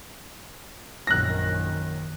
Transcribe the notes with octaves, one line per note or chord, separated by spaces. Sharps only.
A#1 F#2 D#3 F#6 A#6